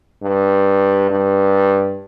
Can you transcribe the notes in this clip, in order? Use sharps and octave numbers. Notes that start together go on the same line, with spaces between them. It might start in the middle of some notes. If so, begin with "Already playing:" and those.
G2
G2